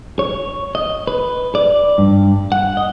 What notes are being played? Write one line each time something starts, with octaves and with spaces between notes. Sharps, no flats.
C#5
D#5
B4
D5
G2
F#5
D#5